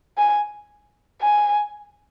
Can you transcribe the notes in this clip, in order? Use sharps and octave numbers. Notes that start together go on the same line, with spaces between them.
G#5
G#5